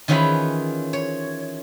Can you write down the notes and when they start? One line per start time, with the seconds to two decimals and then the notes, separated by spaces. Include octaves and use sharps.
0.08 D#3 E3 C#4 F4 G#4 B5
0.93 C#5